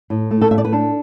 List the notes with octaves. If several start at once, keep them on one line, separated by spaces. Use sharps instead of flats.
A2
A3
A4
A2 E5
D5
B4
D4 A4